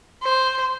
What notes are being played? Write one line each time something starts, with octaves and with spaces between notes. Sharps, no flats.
C5